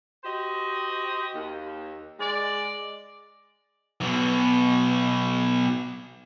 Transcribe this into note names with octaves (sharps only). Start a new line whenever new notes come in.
F#4 G4 C5 D#5
D#2
G#3 D5
B1 B2